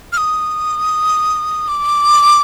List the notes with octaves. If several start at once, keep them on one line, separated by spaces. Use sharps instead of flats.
F6
D#6
D6